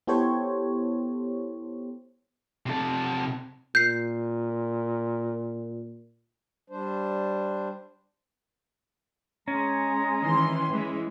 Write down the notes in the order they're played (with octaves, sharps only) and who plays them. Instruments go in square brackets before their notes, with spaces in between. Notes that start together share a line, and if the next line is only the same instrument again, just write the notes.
[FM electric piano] B3 E4 G4 A4 C5 C#5
[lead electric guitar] C3 A4
[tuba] A#2 [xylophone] G6 C7
[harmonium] G3 D4 C5
[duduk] G#3 [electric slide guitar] C#4 [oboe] A#5
[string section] D#3 E3 C6
E3 G#3